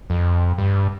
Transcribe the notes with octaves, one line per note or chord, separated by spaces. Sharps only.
F2
G2